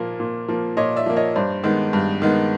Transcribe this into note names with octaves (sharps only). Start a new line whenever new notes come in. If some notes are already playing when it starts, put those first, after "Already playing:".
Already playing: A#2 F3 A#3
A#2
F3 A#3
A#2 C#5 D#5
D5 E5
F3 A#3
C#5 D#5
G2 C5 D5
D#3 G#3 B3
G2
D#3 G#3 B3